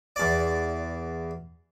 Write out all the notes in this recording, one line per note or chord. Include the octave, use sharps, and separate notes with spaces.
E2 D5